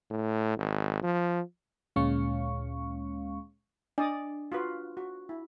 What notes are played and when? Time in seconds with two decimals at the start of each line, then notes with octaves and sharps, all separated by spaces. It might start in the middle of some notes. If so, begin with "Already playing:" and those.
0.10 A2
0.57 G#1
1.03 F3
1.96 D2 A#2 G#3 C#4 F5 C#6
3.98 D4 D5 D#5 D#6
4.52 F4 F#4 B4
4.97 F#4
5.29 E4